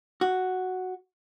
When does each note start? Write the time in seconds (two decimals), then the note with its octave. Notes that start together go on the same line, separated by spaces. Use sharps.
0.21 F#4